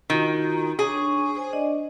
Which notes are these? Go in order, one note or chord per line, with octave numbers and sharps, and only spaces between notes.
D#3 F4 F#4 A#5
D4 G#4 C#5 C#6
C5 G#5
D4 D5 D#5